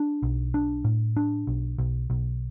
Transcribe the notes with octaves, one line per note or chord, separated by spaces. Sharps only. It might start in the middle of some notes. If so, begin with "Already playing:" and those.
Already playing: D4
B1
D4
A2
D4
B1
B1
B1